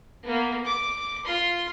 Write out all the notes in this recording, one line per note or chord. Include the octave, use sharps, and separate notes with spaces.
A#3 B3
D6
F4 C6